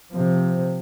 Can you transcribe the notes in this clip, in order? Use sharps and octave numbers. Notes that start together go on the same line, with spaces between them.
C3 F3